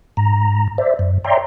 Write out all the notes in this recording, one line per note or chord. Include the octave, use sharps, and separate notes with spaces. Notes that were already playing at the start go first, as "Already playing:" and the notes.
G#2 A#5
C5 D5 E5
F#2
C#5 D5 E5 G5 A#5 C6